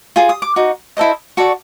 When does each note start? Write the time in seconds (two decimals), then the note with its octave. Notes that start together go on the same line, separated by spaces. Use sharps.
0.16 F4 G#4
0.29 D#6
0.42 D6
0.56 D#4 F#4
0.97 E4 A4 C5 D#5
1.37 F#4 A4 D5 C#6